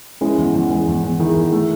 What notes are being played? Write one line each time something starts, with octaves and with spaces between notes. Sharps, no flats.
G#3 C#4 E4
E2
E2
G#3
E2
E2
D#3 E4 G#4
E2
A3